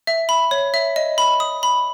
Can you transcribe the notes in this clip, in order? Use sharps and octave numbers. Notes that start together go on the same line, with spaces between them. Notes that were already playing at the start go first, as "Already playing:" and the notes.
E5
B5
C#5
E5
D#5
B5
D#6
B5